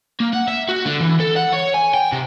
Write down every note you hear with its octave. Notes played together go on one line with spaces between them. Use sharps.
A#3
F#5
E5
F#4
D3
E3
A4
F#5
C#5
G#5
G5
C3